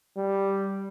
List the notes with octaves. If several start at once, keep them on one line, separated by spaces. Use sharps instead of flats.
G3